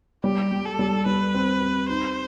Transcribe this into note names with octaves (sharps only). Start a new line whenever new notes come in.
G3 G4
G3
A4
G3
G3 B4
C4
C4
D#4 C5